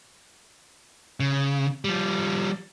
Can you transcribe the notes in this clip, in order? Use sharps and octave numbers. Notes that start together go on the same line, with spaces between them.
C#3
F3 G3